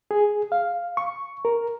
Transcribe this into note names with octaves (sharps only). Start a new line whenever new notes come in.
G#4
F5
C#6
A#4